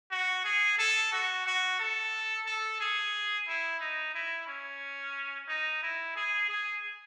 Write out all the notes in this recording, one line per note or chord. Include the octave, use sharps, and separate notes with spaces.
F#4
G#4
A4
F#4
F#4
A4
A4
G#4
E4
D#4
E4
C#4
D#4
E4
G#4
G#4